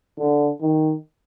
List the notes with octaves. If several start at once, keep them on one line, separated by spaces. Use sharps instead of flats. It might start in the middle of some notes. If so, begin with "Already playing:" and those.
D3
D#3